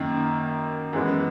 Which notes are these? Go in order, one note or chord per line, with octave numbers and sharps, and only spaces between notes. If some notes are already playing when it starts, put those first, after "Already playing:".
Already playing: F#2 D#3 A#3
F#2 E3 G#3 B3